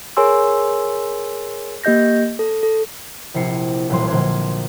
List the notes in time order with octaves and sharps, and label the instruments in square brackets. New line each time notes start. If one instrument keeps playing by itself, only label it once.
[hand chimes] G#4 A#4 C#5 G#5 C6 E6
A#3 G4 D#5 G6 A#6
A4
A4
[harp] A#1 C3 E4 C7 C#7
E1 B1 A#2 G3 C6
A#1 D3 A#3 C6 F#6 G#6